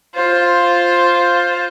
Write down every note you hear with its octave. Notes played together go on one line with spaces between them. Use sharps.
F4 C5